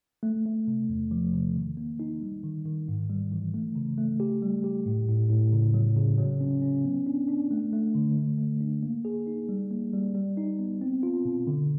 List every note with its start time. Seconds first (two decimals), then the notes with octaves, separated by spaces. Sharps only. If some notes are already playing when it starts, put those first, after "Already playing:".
0.23 A3
0.45 A3
0.67 C3
0.89 E2
1.11 F3
1.34 C3
1.55 D#3
1.77 A#3
2.00 D#4
2.21 G3
2.43 D#3
2.66 D#3
2.88 G#2
3.10 G3
3.32 E3
3.54 A3
3.75 C#3
3.98 A3
4.20 G4
4.42 G3
4.64 G4
4.86 A2
5.08 A2
5.30 A2
5.52 C#3
5.74 F#3
5.97 C#3
6.18 F#3
6.41 C#4
6.62 C#4
6.84 B3
7.07 D4
7.28 D4
7.51 A3
7.73 A3
7.95 D3
8.17 A3
8.38 A3
8.61 D4
8.83 A#3
9.05 G#4
9.27 D#4
9.49 G3
9.71 A#3
9.93 G3
10.15 G3
10.37 D#4
10.59 B3
10.81 C4
11.03 F4
11.25 B2
11.47 D3